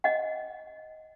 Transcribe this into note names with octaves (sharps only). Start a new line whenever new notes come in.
D#5 F#5